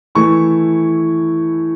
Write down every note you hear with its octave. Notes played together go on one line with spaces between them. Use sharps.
E3 A3 E4 C#6